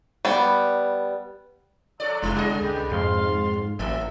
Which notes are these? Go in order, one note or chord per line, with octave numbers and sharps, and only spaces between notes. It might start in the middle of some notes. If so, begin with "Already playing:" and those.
G3 B3
F#3 A4 D5
F1 G3 G#3 E4
B2 D3 G#4 D#5
C#2 G4 B4
F2 G#2 F5 C6
A1 F#3 A3 E5